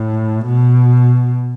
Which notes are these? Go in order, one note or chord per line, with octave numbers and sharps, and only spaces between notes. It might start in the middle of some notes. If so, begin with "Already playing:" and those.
Already playing: A2
B2